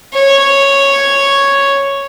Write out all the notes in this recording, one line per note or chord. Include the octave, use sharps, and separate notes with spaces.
C#5